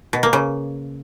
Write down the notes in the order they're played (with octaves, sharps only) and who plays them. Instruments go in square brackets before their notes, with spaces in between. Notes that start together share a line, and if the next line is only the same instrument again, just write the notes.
[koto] B2
A#3
C#3